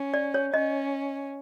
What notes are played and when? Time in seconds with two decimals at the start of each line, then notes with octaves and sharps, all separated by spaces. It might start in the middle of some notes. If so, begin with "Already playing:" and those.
Already playing: C#4
0.14 D5
0.34 C#5
0.54 C#4 D#5